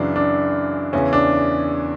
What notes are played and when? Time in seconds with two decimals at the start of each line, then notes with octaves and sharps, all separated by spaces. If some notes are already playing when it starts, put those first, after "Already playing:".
Already playing: F#2 C#3 E3 D4
0.16 D4
0.93 E2 C#3 E3 C#4
1.13 D4